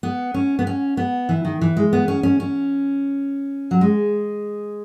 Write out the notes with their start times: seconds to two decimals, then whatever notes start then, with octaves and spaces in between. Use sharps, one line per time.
0.03 B3
0.34 C#4
0.59 B3
0.67 C#4
0.97 B3
1.29 E3
1.45 D#3
1.61 E3
1.77 G#3
1.93 B3
2.08 C#4
2.23 C#4
2.40 C#4
3.71 F#3
3.81 G#3